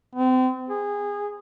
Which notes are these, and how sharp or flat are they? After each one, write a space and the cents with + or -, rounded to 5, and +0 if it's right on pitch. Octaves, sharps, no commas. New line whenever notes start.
C4 -35
G#4 -20